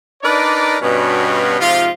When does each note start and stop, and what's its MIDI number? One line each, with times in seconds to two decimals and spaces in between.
0.23 0.77 62
0.23 0.77 63
0.23 0.77 70
0.23 0.77 71
0.23 0.77 74
0.81 1.59 43
0.81 1.59 47
0.81 1.59 61
1.60 1.87 44
1.60 1.87 48
1.60 1.87 53
1.60 1.87 65